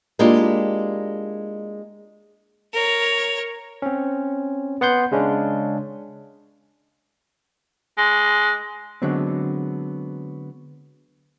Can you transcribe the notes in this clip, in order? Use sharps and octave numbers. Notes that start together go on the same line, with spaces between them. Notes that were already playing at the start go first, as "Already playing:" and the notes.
G#3 A#3 D4 E4 F4 G4
A#4 C#5
C4 C#4
B3 F#5 C6 G6
C#3 G#3 C#4 D4
G#3
D3 F#3 G#3 B3 C4